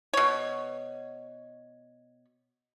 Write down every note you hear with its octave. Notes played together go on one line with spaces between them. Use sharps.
B2 C#5